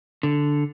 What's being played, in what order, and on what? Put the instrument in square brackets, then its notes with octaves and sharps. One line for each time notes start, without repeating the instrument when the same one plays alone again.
[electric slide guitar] D3